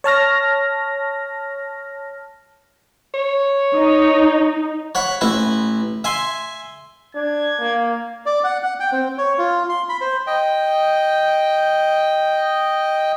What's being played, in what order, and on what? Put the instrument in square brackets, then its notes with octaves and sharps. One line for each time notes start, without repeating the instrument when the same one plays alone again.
[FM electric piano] C#5 A5 F6 A#6
[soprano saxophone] C#5
[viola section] D#4
[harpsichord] C#5 F#5 B5
A1 E4 B4
E5 G#5 C6
[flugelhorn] D4 [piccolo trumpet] G#6
[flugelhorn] A#3
[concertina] D5
F#5
F#5
G5
C4
C#5
F4
C6
B5
C5
D#5 G5